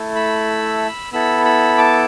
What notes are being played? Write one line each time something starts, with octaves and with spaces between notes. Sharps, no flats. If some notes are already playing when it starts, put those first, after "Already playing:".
Already playing: A3 E4 A4
B5 E6
B3 E4 A4 B5 E6
B5 E6
A5 D6